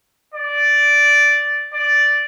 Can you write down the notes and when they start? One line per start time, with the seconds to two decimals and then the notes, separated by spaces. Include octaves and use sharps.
0.34 D5
1.73 D5